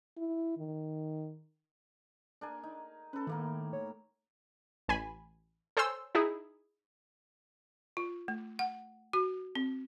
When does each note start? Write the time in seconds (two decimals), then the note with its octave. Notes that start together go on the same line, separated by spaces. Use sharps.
0.17 E4
0.57 D#3
2.41 D4 A#4 G#5
2.63 D#4
3.13 C#4 A4 B4
3.27 A2 D#3 A#3 A#4
3.73 C#5
4.88 A1 G#5 B5
5.77 A4 C5 C#5 G#5 C6 E6
6.15 D#4 E4 G#4
7.97 F4
8.28 A3
8.59 F#5
9.13 F#4
9.55 C4